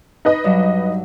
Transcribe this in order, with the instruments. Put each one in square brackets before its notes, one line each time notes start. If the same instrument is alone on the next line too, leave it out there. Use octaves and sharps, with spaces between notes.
[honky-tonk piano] D#4 B4 D#5
[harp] G2 F#3